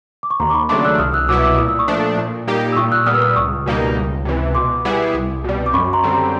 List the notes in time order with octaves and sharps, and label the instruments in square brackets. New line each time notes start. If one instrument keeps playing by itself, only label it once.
[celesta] D6
C#6
[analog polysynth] D#2 [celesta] A#5 C6
[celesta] D6
B5 C#6
[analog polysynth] C#3 F#3 A3 D4 [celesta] C6 D6
[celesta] E6 F#6
[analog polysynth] C2 [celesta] D#6 F6
[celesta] E6 F#6
[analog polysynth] B2 F#3 B3 E4 [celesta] D6 E6
[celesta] D6 E6
[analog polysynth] A#2 [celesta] D#6
[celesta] E6
C#6 D#6
[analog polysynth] F3 A3 D4
A#2
G3 A#3 D#4 G4
[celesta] E6
[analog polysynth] A#2 [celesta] C#6 D#6
[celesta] E6 F#6
[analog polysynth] G3 B3 [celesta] D#6 F6
[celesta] E6
D#6 F6
E6
[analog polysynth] C#2 [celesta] C#6 D#6
[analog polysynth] B2 G3 A#3 D#4
C#2
C3 E3
[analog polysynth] B2 [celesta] C6 D6
[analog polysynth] G3 B3 E4 G#4
C2
B2 G3
[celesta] D6
[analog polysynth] F#2 [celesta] B5 C#6
[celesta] C#6
A#5 C6
[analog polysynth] D3 G3 C4
[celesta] A#5 C6